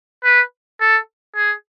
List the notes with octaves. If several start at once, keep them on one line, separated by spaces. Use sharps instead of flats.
B4
A4
G#4